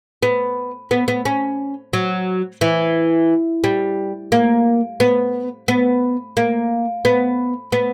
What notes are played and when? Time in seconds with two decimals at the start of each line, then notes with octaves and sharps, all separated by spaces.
0.23 B3
0.91 B3
1.08 B3
1.25 C#4
1.93 F#3
2.61 E3
3.64 G3
4.32 A#3
5.00 B3
5.68 B3
6.37 A#3
7.05 B3
7.72 B3